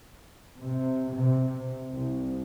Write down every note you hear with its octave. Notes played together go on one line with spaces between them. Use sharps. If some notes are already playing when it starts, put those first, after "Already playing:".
C3
C3
C2